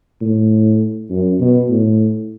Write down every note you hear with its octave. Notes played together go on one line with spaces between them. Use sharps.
A2
F#2
B2
A2